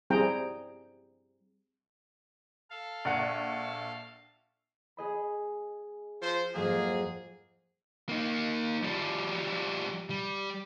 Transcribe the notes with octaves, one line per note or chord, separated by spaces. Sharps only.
G3 C4 E4 G#4 G5 A#5
A4 F5
A#1 F#5
G#4 D#5 B5
F3 F4 C5
F2 G#2 F#3 A#3 G#4
A#3 D#4
F3 G3
G3